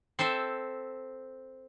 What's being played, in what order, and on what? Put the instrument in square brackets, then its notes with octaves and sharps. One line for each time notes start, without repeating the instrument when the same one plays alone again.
[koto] C4 A4 C5 E5